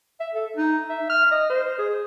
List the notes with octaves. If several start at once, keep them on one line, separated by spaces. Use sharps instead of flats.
E5
A4
D#4
E5
F6
D#5
C5
G#4